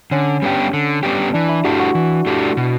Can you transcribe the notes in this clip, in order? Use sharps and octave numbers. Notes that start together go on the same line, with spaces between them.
D3 C#4
G3 B3 D4 G4
D3
G3 B3 D4 G4
E3 D4
E4
A3 D4 F#4 G4
F#4
E3
A3 D4 G4
B2